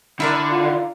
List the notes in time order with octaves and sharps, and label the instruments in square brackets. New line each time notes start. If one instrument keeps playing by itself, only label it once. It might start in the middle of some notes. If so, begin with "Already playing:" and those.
[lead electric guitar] D3 [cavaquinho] E4 A#4 D5
[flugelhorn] F4